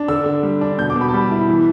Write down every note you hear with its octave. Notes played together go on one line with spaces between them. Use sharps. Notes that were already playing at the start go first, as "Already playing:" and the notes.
Already playing: D4
D3 E6
D3
G3
D4
B2 G6
D6
B2
B5
A5
G3 B5
E4
E3